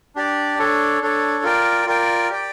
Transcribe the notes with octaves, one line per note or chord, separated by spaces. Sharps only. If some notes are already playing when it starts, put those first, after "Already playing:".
D4 G4 D5
D4 A4 C#5
D4 A4 C#5
F4 A#4 D5 G5
F4 A#4 D5 G5
G4 D5 G5